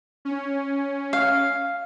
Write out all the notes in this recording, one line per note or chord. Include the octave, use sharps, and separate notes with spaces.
C#4
F5